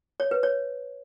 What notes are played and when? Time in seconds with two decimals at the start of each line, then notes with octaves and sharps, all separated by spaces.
0.20 C#5
0.31 B4
0.43 C#5